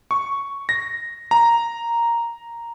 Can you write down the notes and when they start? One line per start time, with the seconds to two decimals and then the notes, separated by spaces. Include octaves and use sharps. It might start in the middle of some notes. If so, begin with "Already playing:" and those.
0.11 C#6
0.69 A#6
1.31 A#5